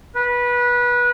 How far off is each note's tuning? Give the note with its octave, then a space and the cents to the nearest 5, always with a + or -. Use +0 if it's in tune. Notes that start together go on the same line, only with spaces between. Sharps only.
B4 -20